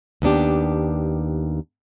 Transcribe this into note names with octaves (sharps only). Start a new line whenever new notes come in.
D#2 B3 D4 G4